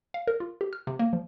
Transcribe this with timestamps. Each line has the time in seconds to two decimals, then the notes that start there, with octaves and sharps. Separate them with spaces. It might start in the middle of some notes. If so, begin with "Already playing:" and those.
0.14 F5
0.27 A#4
0.40 F4
0.61 G4
0.73 F6
0.87 C3
0.99 A#3
1.13 F3